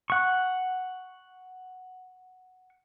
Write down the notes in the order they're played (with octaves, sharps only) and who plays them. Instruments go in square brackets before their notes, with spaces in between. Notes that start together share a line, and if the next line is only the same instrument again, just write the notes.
[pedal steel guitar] F#5 C#6